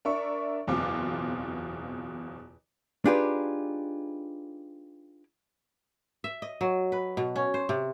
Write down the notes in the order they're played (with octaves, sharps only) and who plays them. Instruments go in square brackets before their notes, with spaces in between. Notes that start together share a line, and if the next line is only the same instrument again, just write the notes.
[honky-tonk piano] D4 A#4 E5 C#6
F#1 E2 B2 C4 F4 D6
[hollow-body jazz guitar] D4 D#4 F4 G4 G#4 B4
[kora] E5
D#5
F#3
B4
B2
C#4
C5
C3